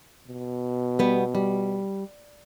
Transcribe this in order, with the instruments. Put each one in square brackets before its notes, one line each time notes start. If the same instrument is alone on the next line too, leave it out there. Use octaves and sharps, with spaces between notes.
[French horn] B2
[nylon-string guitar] G3 B3
G3